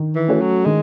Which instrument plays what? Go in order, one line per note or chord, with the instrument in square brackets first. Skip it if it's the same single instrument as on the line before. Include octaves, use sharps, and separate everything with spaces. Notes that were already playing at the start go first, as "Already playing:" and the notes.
Already playing: [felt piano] D#3
[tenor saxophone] E3
[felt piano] A3 C#4 F#4 C#5
[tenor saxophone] F#3
[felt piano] D#3 [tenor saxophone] G#3